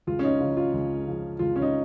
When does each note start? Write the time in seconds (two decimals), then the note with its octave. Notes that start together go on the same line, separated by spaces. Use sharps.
0.07 C#2 F4
0.19 C#4
0.24 D#4
0.40 C#3 F3
0.57 F4
0.74 C#2
1.07 C#3 F3
1.39 C#2 F4
1.56 C#4
1.62 D#4